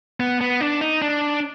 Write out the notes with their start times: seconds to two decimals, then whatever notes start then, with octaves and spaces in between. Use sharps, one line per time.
0.20 B3
0.41 B3
0.61 D4
0.81 D#4
1.02 D4